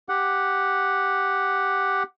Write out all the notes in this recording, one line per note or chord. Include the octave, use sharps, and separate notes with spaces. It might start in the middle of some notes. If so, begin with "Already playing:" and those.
G4 F#5